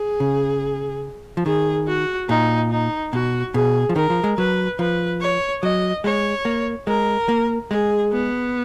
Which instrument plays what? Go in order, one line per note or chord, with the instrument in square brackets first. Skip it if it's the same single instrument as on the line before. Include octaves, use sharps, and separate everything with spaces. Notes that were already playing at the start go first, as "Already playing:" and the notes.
Already playing: [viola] G#4
[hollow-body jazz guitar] C#3
F3
[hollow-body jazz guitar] D#3 [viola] G#4
[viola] F#4
[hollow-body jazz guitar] A#2 [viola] D#4
[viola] D#4
[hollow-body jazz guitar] B2 [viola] F#4
[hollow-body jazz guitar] B2 [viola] G#4
[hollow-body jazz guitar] F3
[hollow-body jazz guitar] D#3 [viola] A#4
[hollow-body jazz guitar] F3
G#3
[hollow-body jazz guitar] F#3 [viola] B4
[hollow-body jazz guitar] F3 [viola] B4
[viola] C#5
[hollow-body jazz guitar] F#3 [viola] D#5
[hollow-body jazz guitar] G#3 [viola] C#5
[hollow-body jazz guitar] A#3
[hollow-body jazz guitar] G#3 [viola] A#4
[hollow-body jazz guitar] A#3
[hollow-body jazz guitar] G#3 [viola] G#4
[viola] B3